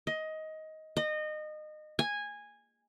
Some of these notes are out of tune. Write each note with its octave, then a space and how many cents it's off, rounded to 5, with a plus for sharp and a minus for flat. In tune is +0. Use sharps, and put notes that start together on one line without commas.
D#5 +15
D#5 -25
G#5 -10